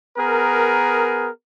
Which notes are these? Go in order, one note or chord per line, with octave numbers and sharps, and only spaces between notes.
B3 G#4 A#4